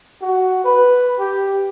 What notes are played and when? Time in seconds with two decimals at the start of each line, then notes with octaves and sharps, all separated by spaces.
0.22 F#4
0.64 B4
1.19 G4